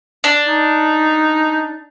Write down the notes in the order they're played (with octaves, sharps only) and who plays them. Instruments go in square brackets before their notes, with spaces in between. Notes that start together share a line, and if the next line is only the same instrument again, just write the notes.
[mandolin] D4
[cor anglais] D#4